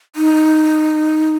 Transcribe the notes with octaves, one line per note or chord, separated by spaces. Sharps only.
D#4